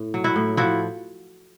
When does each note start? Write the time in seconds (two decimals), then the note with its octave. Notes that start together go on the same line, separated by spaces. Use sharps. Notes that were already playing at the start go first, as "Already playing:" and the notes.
Already playing: A2
0.14 F#3
0.24 E4 F#4
0.36 A2
0.57 F3 E4 F#4